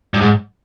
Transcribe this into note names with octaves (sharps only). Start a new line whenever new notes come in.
G2
G#2